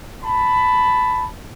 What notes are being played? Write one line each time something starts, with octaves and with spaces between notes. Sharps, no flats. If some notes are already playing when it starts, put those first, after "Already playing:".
A5 B5